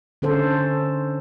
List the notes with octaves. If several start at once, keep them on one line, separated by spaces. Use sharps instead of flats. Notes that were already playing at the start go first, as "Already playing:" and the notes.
D3 C#4 A4 C5